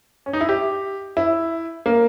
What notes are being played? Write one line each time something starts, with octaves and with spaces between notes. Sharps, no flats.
C#4
D#4
E4
G4
E4
A#3